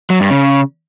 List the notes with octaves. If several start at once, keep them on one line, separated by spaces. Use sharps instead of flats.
F#3
G2
C#3